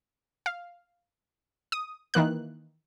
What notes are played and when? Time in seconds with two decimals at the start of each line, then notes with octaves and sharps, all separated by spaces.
0.46 F5
1.72 D#6
2.14 D#3 E3 A#3 F#6